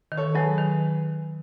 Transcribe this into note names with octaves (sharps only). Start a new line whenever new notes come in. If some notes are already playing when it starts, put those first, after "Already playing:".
D#3
A4 C#5
F#3 G#4 B4
D#3